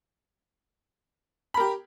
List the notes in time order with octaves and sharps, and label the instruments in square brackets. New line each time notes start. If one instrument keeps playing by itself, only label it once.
[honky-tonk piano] B5
A#4
G4